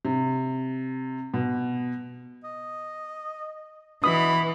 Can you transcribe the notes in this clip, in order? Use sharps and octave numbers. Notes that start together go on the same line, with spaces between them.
C3
B2
D#5
B2 E3 B5 D#6